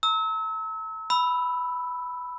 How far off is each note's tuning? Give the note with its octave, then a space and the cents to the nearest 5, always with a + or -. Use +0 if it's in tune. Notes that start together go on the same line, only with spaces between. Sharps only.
A#5 -40 E6 -35
B5 +0 E6 +0